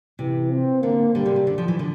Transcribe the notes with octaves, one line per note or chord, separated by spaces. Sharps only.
C3 E3
C4
D3 A#3
D3 G3
C3
C3
D3
F3
E3
D3